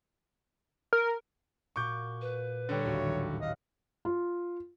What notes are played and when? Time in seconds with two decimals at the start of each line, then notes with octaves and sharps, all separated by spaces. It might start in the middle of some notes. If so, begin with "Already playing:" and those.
0.93 A#4
1.76 A#2 F#4 C#6 D6 G6
2.21 B4
2.69 D3 G3 C#5
2.85 A1 D#2 F#4
3.04 D#3 F#3
3.41 C#5 D#5 F5 F#5
4.05 F4